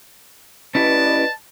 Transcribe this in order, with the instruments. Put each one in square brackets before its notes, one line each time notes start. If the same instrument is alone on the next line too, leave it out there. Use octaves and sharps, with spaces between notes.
[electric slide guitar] C#4 E4 G4 [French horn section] B4 D5 D#5 [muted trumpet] A5